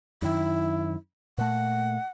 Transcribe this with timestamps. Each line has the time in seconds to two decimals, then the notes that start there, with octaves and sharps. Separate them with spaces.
0.22 F#2 D#3 E4
1.38 A#2 A3 F#5